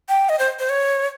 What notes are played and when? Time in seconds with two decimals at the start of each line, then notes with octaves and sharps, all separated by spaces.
0.09 G5
0.29 D#5
0.39 C5
0.59 C5
0.69 C#5